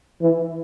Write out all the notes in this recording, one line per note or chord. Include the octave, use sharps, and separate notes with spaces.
E3